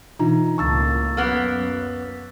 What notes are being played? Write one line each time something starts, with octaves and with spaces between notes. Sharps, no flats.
B2 E3 D4 D#4 F4 A#5
C#2 A2 A#3 A5 C#6 E6 A6
F#2 A#3 B3